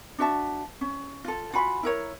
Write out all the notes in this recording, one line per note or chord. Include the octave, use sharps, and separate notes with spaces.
D4 F#4 E5 A5
C#4
F4 A4
F4 F#4 G#5 B5
E4 A#4 C#5